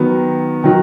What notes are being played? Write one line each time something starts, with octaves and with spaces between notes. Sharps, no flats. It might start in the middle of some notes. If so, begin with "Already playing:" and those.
Already playing: D#3 F#3 B3
D#3 F#3